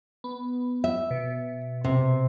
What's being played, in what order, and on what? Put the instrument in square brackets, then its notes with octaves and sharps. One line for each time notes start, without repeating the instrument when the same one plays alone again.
[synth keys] B3
[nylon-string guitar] E5
[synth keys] B2
[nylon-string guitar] C3